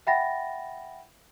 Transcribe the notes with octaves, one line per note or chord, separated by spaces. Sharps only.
E5 F#5 G5 B5 A6 A#6